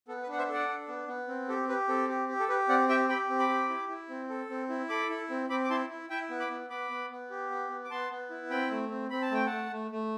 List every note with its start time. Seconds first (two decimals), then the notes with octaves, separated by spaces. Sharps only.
0.08 B3 A4
0.23 B4
0.28 D4 F#5
0.38 C5 E5
0.49 A4 D5 F#5
0.68 D4
0.88 B3
1.08 B3
1.28 C4
1.48 G4 A4
1.68 G4 B4
1.88 C4 A4
2.09 G4
2.28 G4
2.40 A4
2.49 G4 B4
2.68 C4 D5 F#5
2.89 G4 E5 G5
3.09 G4 G5 B5
3.29 C4
3.39 B5 D6
3.49 G4
3.69 E4
3.89 E4
4.09 C4
4.29 A4
4.49 C4
4.69 E4
4.89 A4 B5 D6
5.10 E4
5.30 C4
5.49 C4 B5 D6
5.64 D6
5.70 E4 A5 C6
5.90 E4
6.10 E4 E5 G5
6.30 B3
6.40 B5 D6
6.50 B3
6.70 B3 B5 D6
6.90 B3
7.11 B3
7.30 G4
7.50 B3
7.70 B3
7.84 D6
7.90 B3 A5 C6
8.11 B3
8.30 E4
8.50 C4 G5 B5
8.71 A3
8.91 C4
9.10 C4 B5
9.22 A5
9.31 A3 G5
9.46 F#5 A5
9.51 A3
9.71 A3
9.91 A3